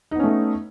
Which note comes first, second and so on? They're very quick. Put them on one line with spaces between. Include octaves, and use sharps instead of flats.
D#4 B3 C#4 A3